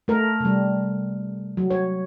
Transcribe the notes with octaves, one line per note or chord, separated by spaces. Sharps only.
A3 A#4
C3 G3
F#3
C#5